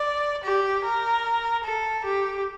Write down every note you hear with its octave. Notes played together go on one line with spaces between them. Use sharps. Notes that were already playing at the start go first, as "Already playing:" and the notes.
Already playing: D5
G4
A#4
A4
G4